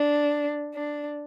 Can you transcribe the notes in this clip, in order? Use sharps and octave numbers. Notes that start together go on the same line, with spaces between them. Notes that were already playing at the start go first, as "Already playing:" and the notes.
Already playing: D4
D4